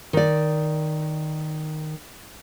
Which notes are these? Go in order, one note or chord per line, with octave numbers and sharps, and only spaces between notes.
D#3 D5